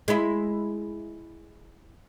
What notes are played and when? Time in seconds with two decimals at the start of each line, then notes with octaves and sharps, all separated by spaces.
0.08 G#3 E4